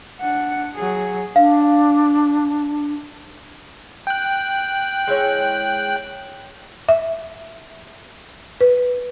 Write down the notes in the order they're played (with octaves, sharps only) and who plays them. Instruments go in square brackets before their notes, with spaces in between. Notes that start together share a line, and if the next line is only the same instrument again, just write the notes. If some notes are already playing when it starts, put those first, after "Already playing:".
[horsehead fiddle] D4 F#5
F#3 G#4
[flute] D4 [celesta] F5
[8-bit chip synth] G5 F#6
[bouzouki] G#3 E4 C#5
[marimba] E5
B4